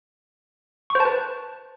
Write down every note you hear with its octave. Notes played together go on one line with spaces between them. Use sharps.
C#6
C5
A5
B4